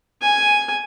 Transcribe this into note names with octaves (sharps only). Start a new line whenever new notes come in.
G#5